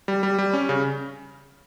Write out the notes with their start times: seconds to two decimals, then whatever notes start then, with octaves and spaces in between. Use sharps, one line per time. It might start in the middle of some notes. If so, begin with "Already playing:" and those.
0.08 G3
0.23 G3
0.38 G3
0.53 C#4
0.69 C#3